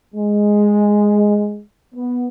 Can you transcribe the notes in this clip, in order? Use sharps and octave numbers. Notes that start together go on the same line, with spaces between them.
G#3
B3